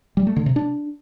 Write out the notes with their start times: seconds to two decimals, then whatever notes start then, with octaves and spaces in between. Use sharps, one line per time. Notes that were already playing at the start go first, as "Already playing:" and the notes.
0.17 G3
0.27 A3
0.36 D3
0.46 C3
0.56 D4